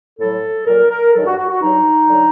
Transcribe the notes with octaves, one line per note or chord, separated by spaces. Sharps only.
A2 F#3 A4
A#2 F#3 A#4
A#4
G2 D#3 F#3 A4
F#4
F#4
F#4
G2 F#3 D#4
D3 F#3